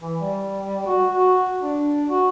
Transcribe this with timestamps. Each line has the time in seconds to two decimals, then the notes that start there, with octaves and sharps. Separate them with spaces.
0.02 E3
0.21 G3
0.87 F#4
1.12 F#4
1.62 D4
2.09 F#4